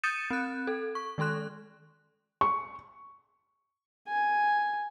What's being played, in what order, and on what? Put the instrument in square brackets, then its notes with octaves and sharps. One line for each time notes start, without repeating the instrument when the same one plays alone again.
[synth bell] D#6 G6 A6 C#7 D#7 E7
C4 F#6
A4
C#6
D#3 G#3 A4 C6 F#6
[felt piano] C#6
[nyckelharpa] G#5